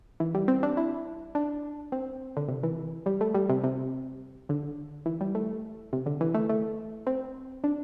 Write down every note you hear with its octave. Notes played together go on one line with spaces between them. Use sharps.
E3
G3
C4
D4
E4
D4
C4
D3
C3
E3
G3
A3
G3
C3
C3
D3
E3
G3
A3
C3
D3
E3
A3
A3
C4
D4